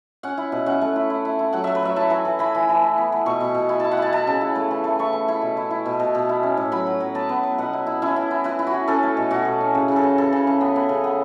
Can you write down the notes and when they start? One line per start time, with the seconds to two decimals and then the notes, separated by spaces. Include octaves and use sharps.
0.23 C#4 F#5
0.37 E4
0.52 B2
0.66 C#4 F#5
0.81 A3
0.96 E4
1.10 E4
1.25 E4
1.39 E4
1.53 F#3 F#5
1.64 A3 E5
1.75 B4
1.83 F#3 E5
1.96 E4 A5
2.10 E3
2.25 E3
2.39 E3 B5
2.55 E3
2.69 E3
2.83 E4
2.98 B3
3.12 B3
3.26 B2 C#6
3.40 B2
3.55 B2
3.69 E4
3.80 E4 A5
3.91 F#5
3.97 E4 A5
4.13 E4 A5
4.27 C#3
4.41 E4
4.55 A3
4.71 E3
4.84 A3
4.99 E4 C#6
5.13 E3
5.28 E4
5.42 B2
5.57 E4
5.71 E4
5.85 B2
6.00 B2
6.15 B2
6.29 E4
6.43 C#4
6.57 A2
6.72 F#3 B5
6.87 F#3
7.00 F#3
7.15 B3 A5
7.29 B3
7.43 B3
7.58 B2 F#5
7.73 E4
7.87 E4
8.02 C#4 E4
8.16 E3
8.31 E4
8.44 E4 B4
8.59 E4
8.67 F#4
8.73 E3
8.88 C#4 A4
9.03 A3
9.17 B2
9.31 B2 F#4
9.45 B2
9.61 C#4
9.75 C#3
9.88 C#3
9.96 A4
10.03 E3
10.18 E3 A4
10.32 C#3
10.47 C#3
10.61 B3
10.76 B3
10.89 C#3
11.04 B3